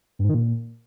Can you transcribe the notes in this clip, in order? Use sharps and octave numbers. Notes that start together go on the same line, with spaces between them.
G2
G#2
D#3
A#2